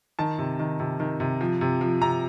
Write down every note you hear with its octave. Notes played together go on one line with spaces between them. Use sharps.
D#3 A5
C3
D#3
C3
D#3
C3
F3
C3
F3
C3 A#5